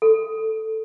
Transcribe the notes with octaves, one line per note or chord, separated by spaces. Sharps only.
A4